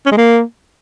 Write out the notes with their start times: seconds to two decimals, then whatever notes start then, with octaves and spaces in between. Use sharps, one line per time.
0.06 C#4
0.11 G#3
0.17 A#3